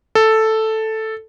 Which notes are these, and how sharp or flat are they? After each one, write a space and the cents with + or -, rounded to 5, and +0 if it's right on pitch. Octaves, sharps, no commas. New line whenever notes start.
A4 +0